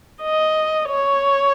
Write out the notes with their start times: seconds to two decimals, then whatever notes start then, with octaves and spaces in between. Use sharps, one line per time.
0.23 D#5
0.89 C#5